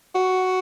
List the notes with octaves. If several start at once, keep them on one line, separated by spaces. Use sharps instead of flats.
F#4